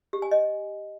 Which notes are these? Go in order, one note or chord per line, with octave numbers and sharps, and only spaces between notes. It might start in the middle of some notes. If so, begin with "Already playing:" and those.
G4
G#5
D#5